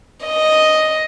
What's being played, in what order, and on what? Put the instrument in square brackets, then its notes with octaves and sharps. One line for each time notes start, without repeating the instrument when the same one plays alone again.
[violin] D#5